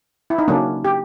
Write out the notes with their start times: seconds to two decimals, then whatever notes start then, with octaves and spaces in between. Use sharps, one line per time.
0.30 E4
0.39 D#4
0.48 C#3 F#3 A#3 C#4 D4
0.85 G4